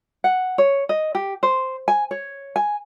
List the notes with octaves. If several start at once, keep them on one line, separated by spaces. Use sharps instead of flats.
F#5
C#5
D#5
G4
C5
G#5
C#5
G#5